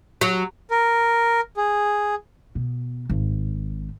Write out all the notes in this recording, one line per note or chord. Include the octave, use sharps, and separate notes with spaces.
F#3
A#4
G#4
B2
G#1